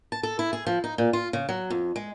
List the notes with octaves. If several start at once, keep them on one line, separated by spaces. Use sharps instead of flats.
A5
A4
E4
G#4
F3
D#4
A#2
F4
C#3
F#3
F2
G#3